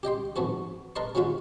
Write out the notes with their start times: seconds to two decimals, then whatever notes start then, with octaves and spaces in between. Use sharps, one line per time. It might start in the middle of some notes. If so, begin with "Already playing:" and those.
0.03 G4 D#5 G5 C6
0.36 F2 G#2 B3 F#4 A4
0.96 A#4 B4 D#5 A5 C6
1.15 F#3 G#3 B3 F4 F#4 B4